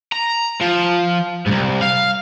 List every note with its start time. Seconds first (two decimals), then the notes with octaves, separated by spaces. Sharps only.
0.12 A#5
0.61 F3
1.46 C2 G#2
1.81 F5